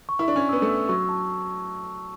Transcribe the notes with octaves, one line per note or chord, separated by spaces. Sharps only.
C#6
E4
D4 C#6
C#4
B3 E6
A3
E6
F#3 C#6
A5